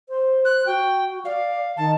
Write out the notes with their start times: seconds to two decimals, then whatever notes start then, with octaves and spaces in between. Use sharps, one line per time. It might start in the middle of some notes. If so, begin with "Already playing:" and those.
0.09 C5
0.45 F#6
0.66 F#4 G5
1.25 D5 F5
1.77 D#3 A5